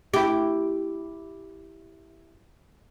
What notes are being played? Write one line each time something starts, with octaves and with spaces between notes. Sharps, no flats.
E4 G4